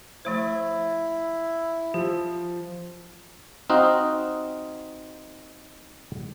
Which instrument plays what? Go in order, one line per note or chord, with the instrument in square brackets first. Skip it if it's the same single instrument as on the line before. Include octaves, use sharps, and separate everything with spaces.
[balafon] F3 A3 C5 [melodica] E4
[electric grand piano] F3 [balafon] G4
[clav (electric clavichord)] C4 D#4 F#4 D#5 F5